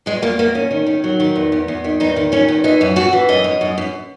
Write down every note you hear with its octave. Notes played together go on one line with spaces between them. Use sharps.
E2 G#3
E2 A#3
E2 A#3
E2 C#4
D#3
D#3
F#3
D#3
E2
E2
E2
D#3
E2 D#4
D#3
D#3 C#4
E2
E3 D#4
F#2
F#2 F#4
E3
F#2 D#5
F#2
F#2
F#2